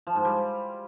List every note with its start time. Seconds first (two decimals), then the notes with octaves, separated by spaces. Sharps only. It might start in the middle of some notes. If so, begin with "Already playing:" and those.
0.07 F3
0.16 G#2
0.25 G3